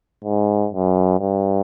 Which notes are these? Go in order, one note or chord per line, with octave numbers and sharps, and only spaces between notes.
G#2
F#2
G2